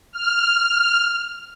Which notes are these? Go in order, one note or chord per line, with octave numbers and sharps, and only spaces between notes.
F6